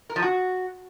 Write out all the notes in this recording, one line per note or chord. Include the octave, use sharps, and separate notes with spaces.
A#4
F3
F#4